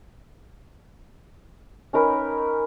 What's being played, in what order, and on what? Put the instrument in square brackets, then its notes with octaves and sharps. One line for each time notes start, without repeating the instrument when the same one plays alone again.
[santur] C#4 D#4 A#4 B4